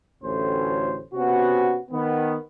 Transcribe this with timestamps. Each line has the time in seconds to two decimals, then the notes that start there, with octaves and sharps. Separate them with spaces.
0.23 A1 D2 A2 C#4 C5
1.14 C3 B3 C#4 F#4
1.91 D#3 B3